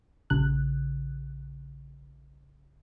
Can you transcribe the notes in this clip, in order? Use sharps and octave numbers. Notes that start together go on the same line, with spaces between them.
A#1 C#3 F#6